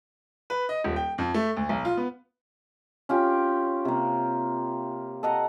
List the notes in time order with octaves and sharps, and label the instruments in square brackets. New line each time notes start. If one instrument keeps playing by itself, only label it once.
[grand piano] B4
D#5
D#1
G5
F2
A3
D2
B1
F4
B3
[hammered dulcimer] C#4 F4 G4
C3 A#3
A4 D#5 F#5 A#5